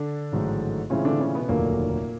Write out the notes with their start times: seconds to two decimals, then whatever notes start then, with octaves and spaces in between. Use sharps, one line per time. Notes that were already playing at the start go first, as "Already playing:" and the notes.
Already playing: D3 D4
0.32 A1 G#2 D#3 F#3 A3
0.90 A2 C#3 E3 G#3 C4 C#4 F4
1.05 D3 D4
1.20 C#3 C#4
1.35 B2 B3
1.48 F1 D#2 A#2 D3 F#3 A3 A#3